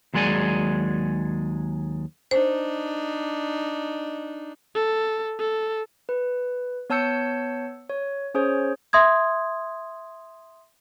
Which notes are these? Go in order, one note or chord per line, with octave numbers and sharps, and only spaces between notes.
D#2 F#3 G#3 G#4 D5 G#5
D4 D#4 C5
A4
A4
B4
B3 C#5 A5 E6 G6 C#7
C#5
C#4 G#4 C5 C#5
E5 C6 D#6 G#6